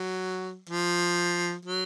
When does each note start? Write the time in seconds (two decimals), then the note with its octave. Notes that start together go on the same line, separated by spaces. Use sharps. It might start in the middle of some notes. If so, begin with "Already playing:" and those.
Already playing: F#3
0.69 F3
1.65 F#3